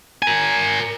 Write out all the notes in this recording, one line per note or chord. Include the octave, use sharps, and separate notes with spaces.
A#4 G#5